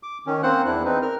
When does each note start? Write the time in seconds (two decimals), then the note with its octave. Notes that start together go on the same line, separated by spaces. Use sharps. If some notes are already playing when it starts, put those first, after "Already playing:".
0.03 D6
0.27 D#3 C#4
0.43 A#3 C4 C5 F#5 F#6
0.65 E2 D4 E4 F#6
0.85 C4 D#4 B4
1.02 A#4 F6